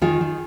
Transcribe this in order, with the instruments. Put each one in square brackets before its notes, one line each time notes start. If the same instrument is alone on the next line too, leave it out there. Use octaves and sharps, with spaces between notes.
[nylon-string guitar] D#3 F4 G#4
D#3